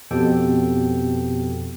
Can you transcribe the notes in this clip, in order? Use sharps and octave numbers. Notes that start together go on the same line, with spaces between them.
F2 B2 F3 G4 A4 G5